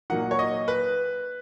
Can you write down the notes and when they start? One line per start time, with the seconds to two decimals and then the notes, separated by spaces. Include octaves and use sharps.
0.10 A#2 F#3 A#3 D#4 F#5
0.31 C#5
0.39 D#5
0.68 B4